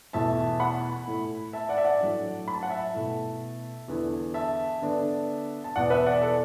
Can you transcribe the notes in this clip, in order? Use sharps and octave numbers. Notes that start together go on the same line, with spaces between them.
E2 B2 A3 E4 E5 A5
F#5 B5
A2 A3 E4
E5 A5
D5 F#5
E5
D5 F#5
A2 F#3 A3 D4
B5
A5
F#5
E5 A5
B2 A3 E4
E2 D3 B3 E4
E5 A5
D3 B3 D4
A5
E2 B2 B3 D5 F#5
B4 E5
D5 F#5
A4 D5